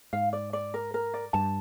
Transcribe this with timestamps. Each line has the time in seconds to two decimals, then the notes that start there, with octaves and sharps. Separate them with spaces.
0.13 G#2 F5
0.33 D5
0.53 D5
0.74 A#4
0.94 A#4
1.14 D5
1.33 G2 A5